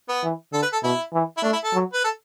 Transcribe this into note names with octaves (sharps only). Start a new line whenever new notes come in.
B3
E3
D3 A4
B4
A4
B2 E4
E3
E4
A3 D4
E4
A4
F#3
B4
A4